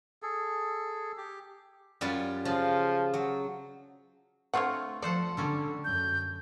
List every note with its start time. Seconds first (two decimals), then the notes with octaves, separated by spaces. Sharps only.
0.22 G#4 A4
1.17 G4
2.01 F#2 G3 F4
2.45 C#3 F3 F4
3.14 F#3
4.53 D3 A3 C4 F4 C#5 F#5
5.02 F3 A4 C5 D5 F#5
5.37 D3 G3 C#4 A4
5.84 F#2 G6